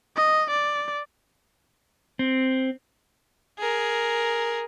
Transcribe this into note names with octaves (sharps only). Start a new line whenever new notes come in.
D#5
D5
C4
G#4 A#4